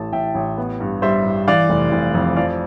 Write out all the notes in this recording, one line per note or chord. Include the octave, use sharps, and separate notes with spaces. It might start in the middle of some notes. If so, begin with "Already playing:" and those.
Already playing: A1 E3 A3 A5
A1 E5 G5
A1
B3
G2
G3 C5 E5
G2
E3 D5 F5
F1
F1
F2
F3 D5 F5